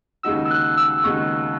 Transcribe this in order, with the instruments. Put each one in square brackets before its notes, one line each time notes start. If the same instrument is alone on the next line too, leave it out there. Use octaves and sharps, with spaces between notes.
[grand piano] D#2 C#3 G#3 D#4 F#4 [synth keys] E6
[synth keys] E6
F#6
E6
[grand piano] D#2 C#3 G#3 D#4 F#4 [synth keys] C#6